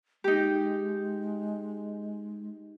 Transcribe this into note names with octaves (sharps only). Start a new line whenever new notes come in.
G#3 D#4 G4